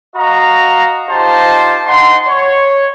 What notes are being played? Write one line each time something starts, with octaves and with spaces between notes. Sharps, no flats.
F#4 D#5 F5 A#5
D#4 F4 G4 C5 A5
D#4 F#5 C6
C#5